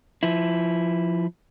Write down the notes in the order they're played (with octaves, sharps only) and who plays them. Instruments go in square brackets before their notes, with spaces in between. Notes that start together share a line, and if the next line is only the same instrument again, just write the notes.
[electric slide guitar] F3 E4